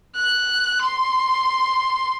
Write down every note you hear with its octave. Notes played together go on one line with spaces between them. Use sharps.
F#6
C6